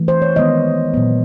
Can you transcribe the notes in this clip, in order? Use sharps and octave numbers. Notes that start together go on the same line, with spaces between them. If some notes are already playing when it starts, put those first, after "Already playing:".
Already playing: E3 A3
C5
C#5
D#3 G#3 B3 D#5
A#2 F#3 B3